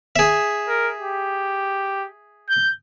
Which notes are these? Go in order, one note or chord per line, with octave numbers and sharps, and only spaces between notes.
G#4 E5
A#4
G4
G6